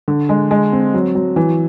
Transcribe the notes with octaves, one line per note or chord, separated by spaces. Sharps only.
D3
G#3
G#3
C4
F#3
F#3
E3